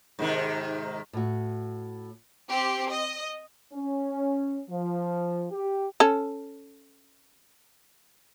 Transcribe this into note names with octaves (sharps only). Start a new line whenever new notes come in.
G#2 C3 D#3
A2 F#4
C4 G4
D#5
C#4
F3
G4
C#4 A4